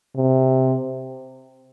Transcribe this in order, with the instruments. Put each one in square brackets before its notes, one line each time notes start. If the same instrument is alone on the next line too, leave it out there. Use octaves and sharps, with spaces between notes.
[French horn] C3